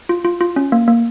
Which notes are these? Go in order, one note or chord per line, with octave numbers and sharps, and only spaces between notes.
F4
F4
F4
C#4
A#3
A#3